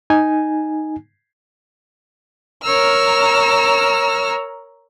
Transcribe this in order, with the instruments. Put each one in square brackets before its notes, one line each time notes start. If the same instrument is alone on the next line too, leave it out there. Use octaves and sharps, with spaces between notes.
[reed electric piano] D#4 G#5
[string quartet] A#4 C#5 A#5 E6 F6